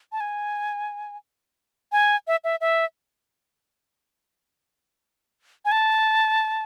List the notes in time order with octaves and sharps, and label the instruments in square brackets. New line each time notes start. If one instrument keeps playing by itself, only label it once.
[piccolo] A5
G#5
G#5
E5
E5
E5
G#5
A5